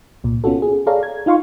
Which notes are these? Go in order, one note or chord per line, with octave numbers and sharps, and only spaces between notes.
C2 A#2
B3 C#4 F4 F#4 A4
G#4
G#4 A4 C#5 D5 F5 A#5
G#6
D#4 F4 F5 C6 C#6